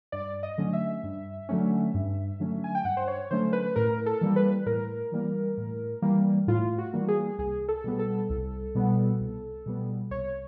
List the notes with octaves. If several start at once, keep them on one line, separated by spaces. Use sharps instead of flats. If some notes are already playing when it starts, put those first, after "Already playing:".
G2 D5
D#5
D3 F#3 A3 C#4
E5
G2
D3 F#3 A3 C#4
G2
D3 F#3 A3 C#4
G#5
G5
G2 F#5
C5
C#5
D3 F#3 A3 C#4 C5
B4
A2 A#4
A4
E3 G3 A#3
B4
A2 A#4
E3 G3 A#3
A2
E3 G3 A#3
A2 F4
F#4
E3 G3 A#3
G#4
C2 G#4
A4
B2 G3 B3
A4
C2
B2 G3 B3
C2
B2 G3 B3
C2 C#5